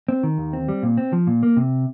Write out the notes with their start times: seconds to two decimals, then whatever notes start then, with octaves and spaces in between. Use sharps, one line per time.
0.08 C4
0.23 D#3
0.38 D#2
0.53 C4
0.69 G3
0.83 A#2
0.98 C4
1.13 F3
1.27 A#2
1.43 A#3
1.57 C3